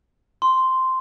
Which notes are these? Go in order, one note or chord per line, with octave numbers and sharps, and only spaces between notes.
C6